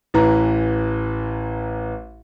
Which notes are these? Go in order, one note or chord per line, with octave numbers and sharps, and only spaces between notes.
A1 E3 A#5